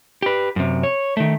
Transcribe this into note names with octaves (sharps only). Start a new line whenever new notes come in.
G4 B4
F#2 C3
C#5
D#3 A3